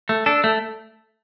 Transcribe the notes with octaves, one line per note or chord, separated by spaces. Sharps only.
A3
D4 A4
A3